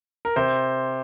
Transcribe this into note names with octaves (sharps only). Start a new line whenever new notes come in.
A#4
C3 C5